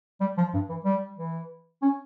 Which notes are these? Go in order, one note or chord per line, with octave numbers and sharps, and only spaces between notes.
G3
F3
G2
E3
G3
E3
C#4